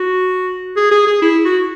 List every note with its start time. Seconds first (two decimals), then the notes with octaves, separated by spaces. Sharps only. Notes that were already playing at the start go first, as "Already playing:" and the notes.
Already playing: F#4
0.76 G#4
0.92 G#4
1.07 G#4
1.22 E4
1.45 F#4